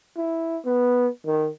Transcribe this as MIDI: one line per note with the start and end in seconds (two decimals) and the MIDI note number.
0.17 0.58 64
0.65 1.08 59
1.26 1.49 51